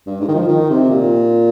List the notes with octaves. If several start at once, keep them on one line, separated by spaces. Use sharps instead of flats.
G2
G#2
D#3
F3
D#3
C3
A#2